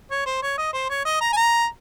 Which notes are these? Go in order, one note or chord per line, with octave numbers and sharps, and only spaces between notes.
C#5
C5
C#5
D#5
C5
C#5
D#5
A#5
G#5
A#5